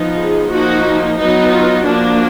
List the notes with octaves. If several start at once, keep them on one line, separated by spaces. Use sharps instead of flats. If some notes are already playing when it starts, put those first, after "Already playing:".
Already playing: F3 B3 D#4
G#4
F3 A#3 D#4 F#4
F#3 B3 D#4
F4
F3 A#3 D4 F#4